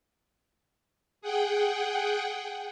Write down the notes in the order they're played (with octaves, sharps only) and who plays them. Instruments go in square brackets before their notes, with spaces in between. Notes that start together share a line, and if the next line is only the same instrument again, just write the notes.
[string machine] G#4 F#5 G5